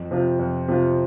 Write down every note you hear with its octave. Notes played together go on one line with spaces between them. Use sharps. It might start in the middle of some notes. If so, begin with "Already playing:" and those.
Already playing: F2
C3 F3 C4 F4
F2
C3 F3 C4 F4